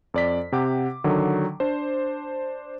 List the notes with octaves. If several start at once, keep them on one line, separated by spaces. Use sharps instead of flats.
F2 D5 B6
C3 G4 F#5 D6
D3 D#3 F#3
D4 C5